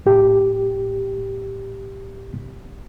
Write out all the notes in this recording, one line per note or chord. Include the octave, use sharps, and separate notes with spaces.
A2 G4